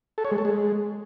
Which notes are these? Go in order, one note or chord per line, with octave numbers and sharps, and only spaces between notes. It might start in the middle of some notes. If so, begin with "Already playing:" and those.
A4
C#5
G#3
A4
G#3